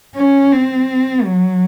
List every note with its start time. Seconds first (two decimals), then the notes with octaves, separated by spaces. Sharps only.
0.16 C#4
0.52 C4
1.24 F#3